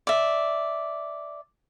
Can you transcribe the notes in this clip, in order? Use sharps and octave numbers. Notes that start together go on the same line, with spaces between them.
D5 E5